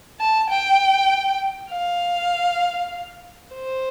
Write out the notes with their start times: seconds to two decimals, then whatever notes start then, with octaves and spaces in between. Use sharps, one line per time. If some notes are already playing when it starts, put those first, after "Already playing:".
0.20 A5
0.50 G5
1.71 F5
3.54 C5